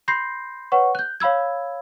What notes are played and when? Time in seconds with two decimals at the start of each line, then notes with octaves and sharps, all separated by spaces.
0.08 B5 C6 G6 A#6 C7
0.72 B4 C#5 F#5 C#6
0.95 F#6 G6
1.20 C#5 F5 B5 E6 G#6